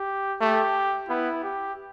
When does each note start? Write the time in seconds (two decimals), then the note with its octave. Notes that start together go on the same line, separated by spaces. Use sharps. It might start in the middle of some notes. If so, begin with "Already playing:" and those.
Already playing: G4
0.41 A3 G4
1.09 B3 E4
1.44 G4